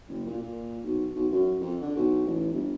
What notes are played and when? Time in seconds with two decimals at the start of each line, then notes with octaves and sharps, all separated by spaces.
0.09 F#1
0.26 A#2
0.39 A#2
0.84 B1
1.15 B1
1.32 F#2
1.60 F2
1.81 D3
1.96 B1
2.27 A1
2.51 G1